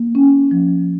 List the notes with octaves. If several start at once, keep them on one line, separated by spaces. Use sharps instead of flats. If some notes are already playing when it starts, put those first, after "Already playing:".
Already playing: A#3
C#4
F3